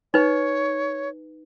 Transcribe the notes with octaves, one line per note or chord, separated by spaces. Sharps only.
D#4 B4 C#5